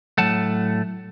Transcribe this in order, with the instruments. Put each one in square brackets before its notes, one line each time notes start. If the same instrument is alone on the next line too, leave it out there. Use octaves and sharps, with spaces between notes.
[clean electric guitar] A2 F#3 A3 F#5 A5